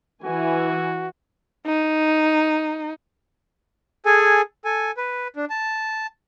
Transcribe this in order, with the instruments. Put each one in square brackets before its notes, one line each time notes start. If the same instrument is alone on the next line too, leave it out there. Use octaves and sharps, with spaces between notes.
[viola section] E3 G#5 [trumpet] F#4
[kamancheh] D#4
[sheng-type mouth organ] G#4 A4 G#5
A4 G#5
B4
D4
A5